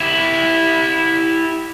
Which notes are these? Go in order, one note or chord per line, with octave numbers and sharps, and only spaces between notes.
E4 G4